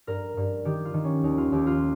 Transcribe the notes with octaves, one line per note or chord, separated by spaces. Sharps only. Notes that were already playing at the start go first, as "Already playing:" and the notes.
G2 A#4
G2
D#3 G4
F4
D#3
C#4
D#2 D#4
F4
D#2 G4
F4